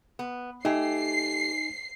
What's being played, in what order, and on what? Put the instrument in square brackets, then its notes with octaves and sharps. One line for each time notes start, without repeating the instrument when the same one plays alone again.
[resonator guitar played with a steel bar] B3
[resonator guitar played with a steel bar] A3 G4 [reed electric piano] D#4 G#5 [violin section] C7